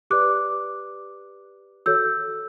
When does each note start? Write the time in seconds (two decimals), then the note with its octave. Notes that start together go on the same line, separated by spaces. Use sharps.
0.10 G4 B4 D5 D6 F#6
1.86 F#4 A4 C#5 E6 G6